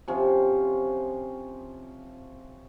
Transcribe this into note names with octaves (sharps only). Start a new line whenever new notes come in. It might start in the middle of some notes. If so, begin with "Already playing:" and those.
C3 F3 C#4